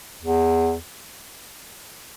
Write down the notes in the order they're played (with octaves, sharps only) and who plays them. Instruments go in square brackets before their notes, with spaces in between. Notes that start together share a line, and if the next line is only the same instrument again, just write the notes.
[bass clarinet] E2